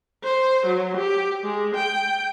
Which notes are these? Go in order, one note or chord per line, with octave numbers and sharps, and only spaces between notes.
C5
F#3
G4
G#3
G5